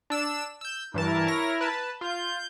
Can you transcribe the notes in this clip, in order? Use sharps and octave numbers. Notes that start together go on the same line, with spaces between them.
D4 E6 E7
E6 G6
G2 E3 E4 A#4 A5
C#5 A#6
B4 A5
F4 G6